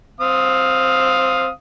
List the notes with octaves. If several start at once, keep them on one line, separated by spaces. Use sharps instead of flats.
C4 F5 D#6